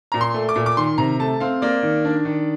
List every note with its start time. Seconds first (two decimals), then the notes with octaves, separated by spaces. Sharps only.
0.12 A#2 A#5
0.21 C6
0.34 A3
0.49 D6
0.56 A#2
0.66 D6
0.77 D#3 C6
0.98 C3 A#5
1.19 A3 A5
1.40 C4 F5
1.62 A#3 D5
1.83 D#3
2.05 D4
2.25 D#3